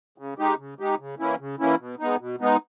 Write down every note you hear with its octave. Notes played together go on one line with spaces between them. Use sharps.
C#3
G#3 D#4 G4
C#3
G#3 D#4 G4
C#3
E3 A#3 C#4 E4
C#3
E3 A#3 C#4 E4
B2
G#3 B3 D#4
B2
G#3 B3 D#4